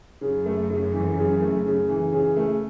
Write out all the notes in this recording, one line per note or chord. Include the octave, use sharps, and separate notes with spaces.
F#2 C#3
A3
C#3
E3
C#3
A3
C#3
E3
C#3
A3